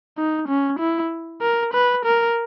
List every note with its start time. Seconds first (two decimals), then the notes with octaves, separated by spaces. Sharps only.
0.18 D#4
0.48 C#4
0.79 E4
1.41 A#4
1.73 B4
2.05 A#4